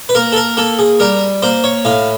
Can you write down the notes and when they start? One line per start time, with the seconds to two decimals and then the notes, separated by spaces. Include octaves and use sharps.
0.09 B4
0.15 A#3 A#4
0.32 A4
0.36 A#4
0.57 A#3 A4
0.79 G#4
1.00 G3 A#4
1.42 A#3 C5
1.64 C#5
1.85 A2 F5